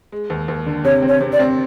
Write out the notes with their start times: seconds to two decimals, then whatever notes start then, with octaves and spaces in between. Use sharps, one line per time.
0.12 G#3
0.30 D#2
0.48 D#2
0.66 D3
0.84 C3 C#5
1.02 C4
1.08 C#5
1.21 C3
1.33 D5
1.39 C4